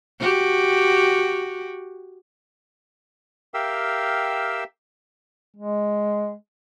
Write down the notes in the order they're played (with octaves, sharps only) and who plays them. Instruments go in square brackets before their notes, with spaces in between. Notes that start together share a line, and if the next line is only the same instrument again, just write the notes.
[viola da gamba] F#4 G4
[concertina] G4 A#4 E5 F5 G5 E6
[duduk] G#3